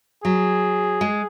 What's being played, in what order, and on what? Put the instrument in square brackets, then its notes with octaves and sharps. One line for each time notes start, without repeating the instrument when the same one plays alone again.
[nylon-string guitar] F#3 [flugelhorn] G#4
[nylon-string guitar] G#3